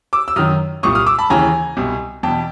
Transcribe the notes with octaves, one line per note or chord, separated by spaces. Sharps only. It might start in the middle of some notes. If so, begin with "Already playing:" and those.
D6 E6
E6
F#2 D#3 D#6 F6
C2 A#2 C#6 D#6
D#6 F6
D6 E6
A5 B5
D#2 C#3 E3 G#5 A#5
C2 B2
E2 B2 G5 A5